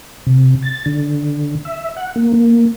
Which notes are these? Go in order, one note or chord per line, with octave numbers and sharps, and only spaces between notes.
C3
A6
D3
E5
F#5
A#3
A#3